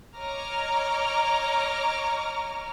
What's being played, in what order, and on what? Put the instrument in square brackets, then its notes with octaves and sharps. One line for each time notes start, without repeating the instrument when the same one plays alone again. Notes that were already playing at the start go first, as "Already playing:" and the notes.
[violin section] C#5 D#5 A#5 D6 F6